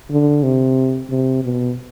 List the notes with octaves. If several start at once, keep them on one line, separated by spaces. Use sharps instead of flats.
D3
C3
C3
B2